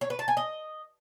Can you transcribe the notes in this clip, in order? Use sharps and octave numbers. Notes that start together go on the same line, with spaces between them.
C#5
B4
A5
G#5
D#5